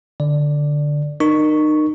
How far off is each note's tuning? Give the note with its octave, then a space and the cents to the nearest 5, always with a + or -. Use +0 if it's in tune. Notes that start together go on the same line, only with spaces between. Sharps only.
D3 +0 D5 +0
D#4 -30 A#4 +0 C#6 +0